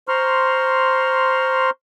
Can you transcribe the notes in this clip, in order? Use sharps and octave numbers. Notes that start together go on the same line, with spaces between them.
C5 A#5 C6 C#6 F6